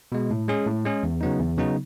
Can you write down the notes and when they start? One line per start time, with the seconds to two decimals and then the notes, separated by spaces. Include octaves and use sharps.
0.12 B2 G#3
0.31 A2
0.48 G#3 C#4 G#4
0.66 A2
0.85 G#3 C#4 G#4
1.03 E2
1.21 C#3 F#3 B3 D#4
1.39 E2
1.57 C#3 F#3 B3 D#4